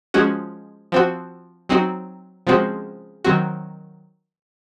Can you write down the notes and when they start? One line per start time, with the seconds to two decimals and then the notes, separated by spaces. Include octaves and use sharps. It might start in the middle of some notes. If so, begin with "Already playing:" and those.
0.14 F3 G#3 C#4 F#4
0.92 F3 C4 F#4
1.69 F#3 C4 D#4 F#4
2.47 C#3 F3 G#3 C4 F#4
3.24 D#3 F#3 C4 F#4